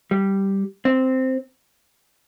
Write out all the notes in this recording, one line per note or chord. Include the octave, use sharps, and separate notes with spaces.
G3
C4